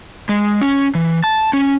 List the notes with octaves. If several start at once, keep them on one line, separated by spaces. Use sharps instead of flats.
G#3
C#4
E3
A5
C#4